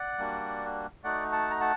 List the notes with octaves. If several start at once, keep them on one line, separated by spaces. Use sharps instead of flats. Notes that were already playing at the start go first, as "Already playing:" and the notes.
Already playing: D5 F#5
G3 A#3 D4 F#4
A3 D#4 F#4 D5 F#5
F#5 A5
A#5
F#5 A5